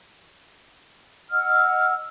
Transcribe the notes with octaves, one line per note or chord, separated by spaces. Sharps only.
D#5 F#5 E6 F6